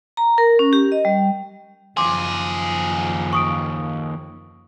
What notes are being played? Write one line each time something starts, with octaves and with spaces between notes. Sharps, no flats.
A#5
A#4
C#4
G4
D#5
G3
F#1 D#2 F3 G#4 C6 D6
C#6 D#6 D7